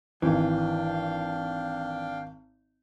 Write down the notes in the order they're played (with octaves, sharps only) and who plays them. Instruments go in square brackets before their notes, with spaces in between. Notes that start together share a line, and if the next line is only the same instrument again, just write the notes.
[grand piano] G#1 [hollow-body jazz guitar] E3 [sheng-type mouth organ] D4 F5 G5